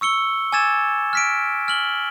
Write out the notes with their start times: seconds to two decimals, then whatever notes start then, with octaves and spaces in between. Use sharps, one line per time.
0.01 C#6 E6 C#7 G7
0.52 G#5 D6 E6 G#6 A6 E7
1.13 F6 B6 D7
1.68 F6 F#7 G7